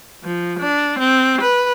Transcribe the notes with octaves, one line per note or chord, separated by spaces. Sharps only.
F3
D4
C4
B4